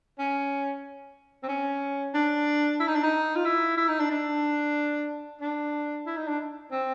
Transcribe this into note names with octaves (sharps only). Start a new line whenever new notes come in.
C#4
C4
C#4
D4
E4
D#4
D4
D#4
F4
E4
E4
D#4
D4
D4
D4
E4
D#4
D4
C4